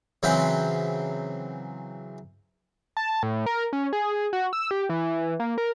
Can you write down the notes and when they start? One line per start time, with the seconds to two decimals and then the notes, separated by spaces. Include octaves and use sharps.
0.23 C#3 E3 F#3 C4 B4 C5
2.97 A5
3.23 A2
3.46 A#4
3.73 C#4
3.93 G#4
4.33 F#4
4.53 E6
4.71 G4
4.90 E3
5.40 A#3
5.58 A#4